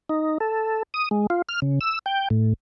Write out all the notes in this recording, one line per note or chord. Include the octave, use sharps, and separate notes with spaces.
D#4
A4
D#6
G#3
F4
F6
C#3
E6
G5
A2